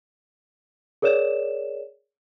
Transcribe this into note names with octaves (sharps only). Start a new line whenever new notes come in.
G#4 A#4 C#5 D5 E7